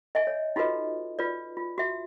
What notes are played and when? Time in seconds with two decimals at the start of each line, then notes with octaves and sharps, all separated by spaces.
0.15 D#5 E5 G#5
0.27 C#5
0.56 D#4 F4 F#4 A4 B4 D#5
1.19 F4 B4 D5
1.57 F4
1.78 F#4 E5